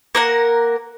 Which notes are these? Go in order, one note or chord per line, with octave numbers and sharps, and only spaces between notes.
A#3 A#4 F#5